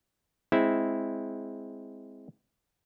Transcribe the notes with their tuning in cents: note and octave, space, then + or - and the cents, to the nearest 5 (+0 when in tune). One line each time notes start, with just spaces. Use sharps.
G#3 +0 C4 +0 E4 -5